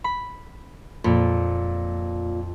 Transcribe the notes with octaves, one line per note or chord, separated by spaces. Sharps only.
B5
F2 A#2 B5